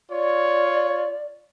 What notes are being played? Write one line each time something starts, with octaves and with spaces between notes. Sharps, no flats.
F4 C#5 D5